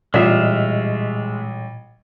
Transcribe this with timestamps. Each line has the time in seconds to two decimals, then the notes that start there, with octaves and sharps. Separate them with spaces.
0.14 A1 A#2 G3 G#3 F4 D5 E5 F5